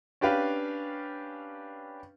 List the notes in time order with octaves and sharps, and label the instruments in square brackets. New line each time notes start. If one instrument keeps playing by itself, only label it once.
[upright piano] C#4 D4 G4 B4 F5